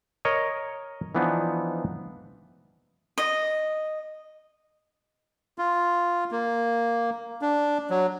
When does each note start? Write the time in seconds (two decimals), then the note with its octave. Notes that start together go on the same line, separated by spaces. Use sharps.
0.25 A#4 C#5 D#5
1.15 E3 F3 B3 D4 D#4
3.18 D#5
5.58 F4
6.31 A#3
7.42 D4
7.90 F#3